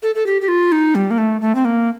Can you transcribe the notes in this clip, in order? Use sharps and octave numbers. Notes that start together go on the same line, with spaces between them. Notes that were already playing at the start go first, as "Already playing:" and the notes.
A4
A4
G4
G4
F4
D#4
G3
A#3
A3
A3
C4
A#3